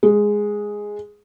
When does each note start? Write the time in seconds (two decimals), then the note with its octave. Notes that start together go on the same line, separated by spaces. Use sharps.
0.03 G#3